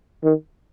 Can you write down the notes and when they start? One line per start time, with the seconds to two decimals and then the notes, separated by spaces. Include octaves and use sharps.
0.24 D#3